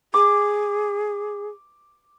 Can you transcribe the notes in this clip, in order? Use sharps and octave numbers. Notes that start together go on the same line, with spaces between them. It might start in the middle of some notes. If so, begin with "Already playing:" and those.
G#4 D6